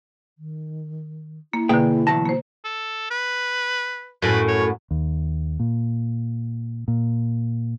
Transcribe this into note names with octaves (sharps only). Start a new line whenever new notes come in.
D#3
A#3 E4
B2 D3 A#3 G#4 G5
E2 F#3 A5 A#6
A#3 C5
A4
B4
F#2 A2 B4
C#5
D#2
A#2
A#2